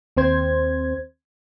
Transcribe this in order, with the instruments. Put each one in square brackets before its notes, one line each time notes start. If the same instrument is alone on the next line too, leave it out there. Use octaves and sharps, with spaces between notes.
[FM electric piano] D#2 C4 C5 G#6